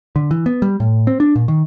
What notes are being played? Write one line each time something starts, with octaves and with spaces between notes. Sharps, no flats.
D3
E3
B3
G3
A2
C4
D4
A#2
D#3